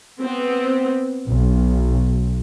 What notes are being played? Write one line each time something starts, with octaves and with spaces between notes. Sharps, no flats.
B3 C4
B1